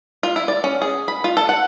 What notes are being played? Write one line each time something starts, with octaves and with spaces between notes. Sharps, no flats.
F4
E4
D5
C#4
G#4
B5
F4
A4
F#5